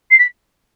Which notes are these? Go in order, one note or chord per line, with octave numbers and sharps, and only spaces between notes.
C7
B6